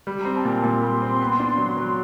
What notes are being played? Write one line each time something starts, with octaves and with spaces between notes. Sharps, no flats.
G3
C4 A#5
A5
A#2 G5
A#2 C6
G3
C4
B3
D4
F#3
F#3